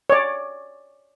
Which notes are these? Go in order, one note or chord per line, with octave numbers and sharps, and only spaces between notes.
C#5 D5